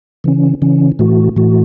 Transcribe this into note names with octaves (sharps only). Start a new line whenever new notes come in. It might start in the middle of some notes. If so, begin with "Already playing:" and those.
C#3 E3 C#4
C#3 E3 C#4
A2 E3 A3 F#4
A2 E3 A3 F#4